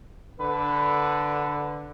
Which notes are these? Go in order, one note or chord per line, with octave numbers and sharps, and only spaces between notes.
D3 B4